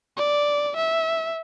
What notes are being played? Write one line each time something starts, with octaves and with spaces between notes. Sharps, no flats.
D5
E5